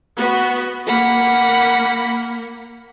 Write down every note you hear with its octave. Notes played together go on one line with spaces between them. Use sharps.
B3 F#4
A#3 F#5 B5